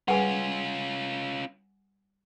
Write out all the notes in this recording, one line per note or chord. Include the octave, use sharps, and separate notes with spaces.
G3 C#4 F4 G#4 B4 F#5 G#5